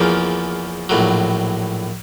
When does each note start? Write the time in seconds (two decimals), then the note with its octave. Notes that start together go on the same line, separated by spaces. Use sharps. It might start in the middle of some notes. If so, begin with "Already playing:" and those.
Already playing: E2 C#3 F3 A#3
0.89 A#1 A2 F#3